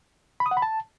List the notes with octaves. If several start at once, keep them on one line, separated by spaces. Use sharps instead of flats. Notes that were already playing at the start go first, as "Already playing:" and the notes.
B5
D#6
F#5
B5
A5